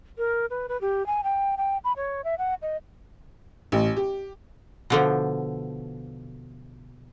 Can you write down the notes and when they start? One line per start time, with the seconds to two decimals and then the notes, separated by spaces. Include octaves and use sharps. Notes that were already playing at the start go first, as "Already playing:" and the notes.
0.18 A#4
0.50 B4
0.69 B4
0.81 G4
1.06 G#5
1.24 G5
1.57 G5
1.84 B5
1.97 C#5
2.24 E5
2.38 F#5
2.62 D#5
3.72 A1
3.96 G4
4.90 B2 D3 F3